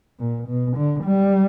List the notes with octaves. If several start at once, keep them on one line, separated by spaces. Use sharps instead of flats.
A#2
B2
D3
G3